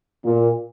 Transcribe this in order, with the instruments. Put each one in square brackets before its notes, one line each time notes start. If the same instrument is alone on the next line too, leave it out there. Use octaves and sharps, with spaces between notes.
[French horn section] A#2